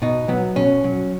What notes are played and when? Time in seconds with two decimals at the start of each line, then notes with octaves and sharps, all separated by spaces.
0.02 B2 D#4
0.28 F#3 B3
0.56 B2 C#4
0.84 F#3